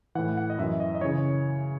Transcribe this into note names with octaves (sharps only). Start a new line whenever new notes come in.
A2 E3 F#5
F#5
D#5
F#2 E3 E5
D#5
D#5
C#3 E3 C#5